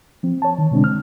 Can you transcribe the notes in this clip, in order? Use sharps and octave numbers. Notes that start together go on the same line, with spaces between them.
F3 C4
C#5 A5
D#3
B2 D3 G#3 C4 D4
F6